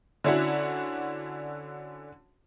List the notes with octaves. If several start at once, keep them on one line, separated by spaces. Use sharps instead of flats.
D3 C#4 D4 E4 F#4